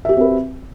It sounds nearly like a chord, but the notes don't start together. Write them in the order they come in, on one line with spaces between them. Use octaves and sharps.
E5 G4 F#4 C4 B4